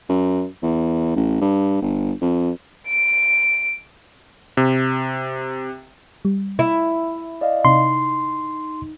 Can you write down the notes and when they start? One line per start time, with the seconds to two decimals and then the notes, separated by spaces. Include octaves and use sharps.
0.09 F#2
0.63 E2
1.16 A1
1.41 G2
1.82 G1
2.21 F2
2.87 D7
4.57 C3
6.25 G3
6.59 E4
7.41 D5 D#5 F5
7.65 C3 D#4 C6